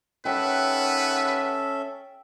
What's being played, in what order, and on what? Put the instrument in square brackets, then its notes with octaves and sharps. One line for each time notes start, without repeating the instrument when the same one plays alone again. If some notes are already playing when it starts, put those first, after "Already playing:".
[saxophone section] D#2 F#5 [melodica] C#4 A4 E5 [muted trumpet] B4 [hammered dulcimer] G5